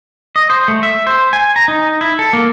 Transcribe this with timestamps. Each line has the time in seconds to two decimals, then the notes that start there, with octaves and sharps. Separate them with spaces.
0.36 D#5
0.50 C5
0.68 A3
0.83 E5
1.07 C5
1.33 G#5
1.56 A#5
1.68 D#4
2.01 E4
2.19 A4
2.33 A#3